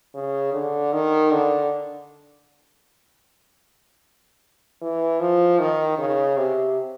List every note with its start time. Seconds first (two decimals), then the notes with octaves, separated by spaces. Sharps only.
0.15 C#3
0.53 D3
0.93 D#3
1.31 D3
4.81 E3
5.20 F3
5.59 D#3
5.98 C#3
6.37 C3